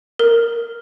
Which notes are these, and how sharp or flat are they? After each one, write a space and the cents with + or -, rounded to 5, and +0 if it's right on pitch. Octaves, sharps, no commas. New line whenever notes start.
A#4 -5